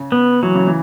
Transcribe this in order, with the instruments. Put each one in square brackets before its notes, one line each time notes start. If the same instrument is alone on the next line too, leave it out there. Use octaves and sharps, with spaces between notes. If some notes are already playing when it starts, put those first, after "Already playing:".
Already playing: [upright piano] C#3
[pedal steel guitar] B3
[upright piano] E3 [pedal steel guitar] F#3
[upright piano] C#3
E3